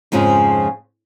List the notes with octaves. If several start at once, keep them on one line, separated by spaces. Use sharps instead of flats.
F2 G#2 C#3 F3 G#4